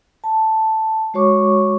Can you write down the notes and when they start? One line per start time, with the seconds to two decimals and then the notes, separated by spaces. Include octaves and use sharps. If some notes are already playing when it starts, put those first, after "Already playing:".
0.24 A5
1.14 G#3 F#4 C#5 C#6 D6